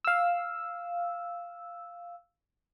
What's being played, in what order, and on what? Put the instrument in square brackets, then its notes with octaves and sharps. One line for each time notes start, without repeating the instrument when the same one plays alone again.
[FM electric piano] F5 E6